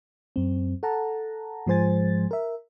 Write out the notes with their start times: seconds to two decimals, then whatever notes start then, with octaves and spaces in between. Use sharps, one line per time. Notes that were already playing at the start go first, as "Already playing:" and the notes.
0.36 F#2 C4
0.83 A4 F#5 A5 A#5
1.67 G#2 F3 G#3 C5 G#5 A6
2.31 A#4 E5